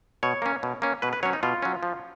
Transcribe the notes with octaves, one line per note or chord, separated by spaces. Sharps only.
B2 C#5
A#3 C#4
B2
A#3 C#4
B2 B4
B4
F#3 C#4 C#5
D#4
B2 F4
F#3 C#4
F3